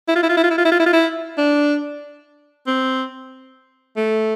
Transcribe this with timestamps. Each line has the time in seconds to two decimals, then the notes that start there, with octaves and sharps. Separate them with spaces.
0.08 E4
0.16 F4
0.23 E4
0.29 F4
0.37 E4
0.44 F4
0.51 E4
0.58 F4
0.65 E4
0.72 F4
0.80 E4
0.86 F4
0.93 E4
1.38 D4
2.67 C4
3.97 A3